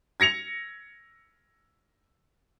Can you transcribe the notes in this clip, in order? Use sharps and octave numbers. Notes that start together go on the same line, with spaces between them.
G#6 A#6 C#7 F7